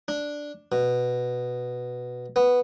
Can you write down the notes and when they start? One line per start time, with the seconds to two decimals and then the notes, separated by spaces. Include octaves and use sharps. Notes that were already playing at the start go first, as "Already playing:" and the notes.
0.08 D4
0.72 B2
2.36 B3